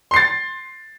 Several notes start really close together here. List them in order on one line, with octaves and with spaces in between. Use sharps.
C6 C7 A6